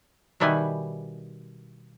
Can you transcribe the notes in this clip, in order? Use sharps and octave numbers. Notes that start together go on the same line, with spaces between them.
B2 D#3 G3 E4 B4 G#5